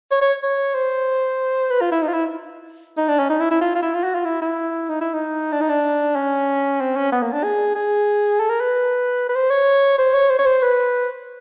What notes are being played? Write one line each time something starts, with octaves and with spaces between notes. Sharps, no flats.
C#5
C#5
C#5
C5
B4
F4
E4
D#4
F4
E4
D#4
D4
C#4
D#4
E4
E4
F4
F4
E4
F4
F#4
F4
E4
E4
D#4
E4
D#4
D4
D#4
D4
C#4
C4
C#4
B3
A#3
D4
G#4
G#4
A4
A#4
B4
B4
C5
C#5
C5
C#5
C5
C#5
C5
B4